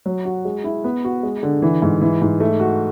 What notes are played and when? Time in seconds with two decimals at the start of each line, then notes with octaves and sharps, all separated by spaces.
0.06 F#3
0.25 F#4
0.45 G#3
0.64 E4
0.84 B3
1.04 F#4
1.23 G#3
1.43 D3
1.62 E3
1.82 G#2
2.01 E3
2.22 G#2
2.40 A3
2.60 F#4